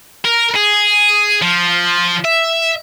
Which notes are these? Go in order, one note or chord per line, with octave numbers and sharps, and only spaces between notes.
A#4
G#4
F3
E5